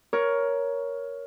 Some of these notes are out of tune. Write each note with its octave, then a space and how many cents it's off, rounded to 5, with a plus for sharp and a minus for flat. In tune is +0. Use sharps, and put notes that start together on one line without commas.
A#4 +10 C#5 +10